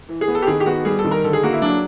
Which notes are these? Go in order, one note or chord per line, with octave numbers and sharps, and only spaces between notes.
E3
G#4
B3
A4
G4
D#3 G#4
G4
B3 F#4
G3 G#4
A4
D#3
A#4
D3 A4
G#4
A#3 F#4
E4
F#3 D4